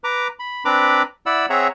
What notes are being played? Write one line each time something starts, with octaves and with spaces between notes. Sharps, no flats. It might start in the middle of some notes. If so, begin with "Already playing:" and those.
B4 A#5 D6
B5
C4 D4 B4 A#5 B5 D6
E4 D5 F#5 B5 E6
C4 G#4 C#5 E5 F#5 A#5